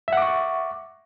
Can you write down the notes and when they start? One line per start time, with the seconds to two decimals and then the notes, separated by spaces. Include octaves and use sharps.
0.08 E5
0.13 F#5
0.17 D6
0.22 C#6